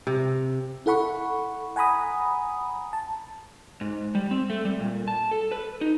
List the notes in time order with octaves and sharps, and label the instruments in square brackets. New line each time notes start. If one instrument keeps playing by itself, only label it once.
[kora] C3
[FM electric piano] E4 A4 F#5 B5 C#6
F#5 G#5 A#5 B5 D#6
A5
[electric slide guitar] G#2
G3
C4
A3
G3
A#2
A5
A4
B4
D#4